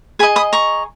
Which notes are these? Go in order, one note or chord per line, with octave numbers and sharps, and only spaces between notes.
G#4 D#5 G#5 B5
B5 D#6
A#5 C#6